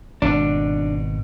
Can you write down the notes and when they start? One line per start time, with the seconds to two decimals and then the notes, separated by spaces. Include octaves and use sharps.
0.22 G#1 B2 D4